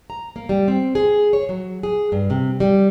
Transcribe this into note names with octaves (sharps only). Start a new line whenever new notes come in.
A#5
A#3
G3
C4
G#4
C#5
F#3
G#4
G2
C3
G3